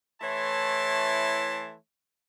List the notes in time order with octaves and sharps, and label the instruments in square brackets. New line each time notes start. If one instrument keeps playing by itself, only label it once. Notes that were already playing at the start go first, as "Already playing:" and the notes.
[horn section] E3 A3 E4 C#5 A5 C6